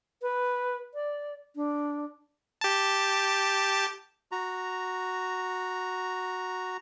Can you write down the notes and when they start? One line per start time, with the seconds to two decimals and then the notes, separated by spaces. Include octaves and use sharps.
0.22 B4
0.94 D5
1.56 D4
2.61 G4 A5
4.32 F#4 A#5